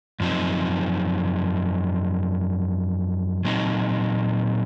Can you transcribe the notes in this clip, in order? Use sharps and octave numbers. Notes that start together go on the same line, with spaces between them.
F#2 F3 C4 D#4
A#2 F#3 C4 D#4